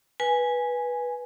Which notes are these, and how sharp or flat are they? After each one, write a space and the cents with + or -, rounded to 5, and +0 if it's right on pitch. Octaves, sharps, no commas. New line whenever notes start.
B4 -15 G#5 +0